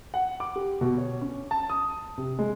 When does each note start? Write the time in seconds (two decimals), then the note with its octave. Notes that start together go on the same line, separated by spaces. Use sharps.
0.14 F#5
0.40 D6
0.56 G4
0.81 B2
0.98 C#5
1.21 C#4
1.51 A5
1.70 D#6
2.18 C3
2.39 G#3